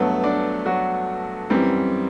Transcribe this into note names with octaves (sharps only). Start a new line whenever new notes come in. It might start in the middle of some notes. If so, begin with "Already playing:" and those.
Already playing: G2 F#3 A3 B3 A4
D4 D5
F#3 F#4
F#2 E3 G3 C4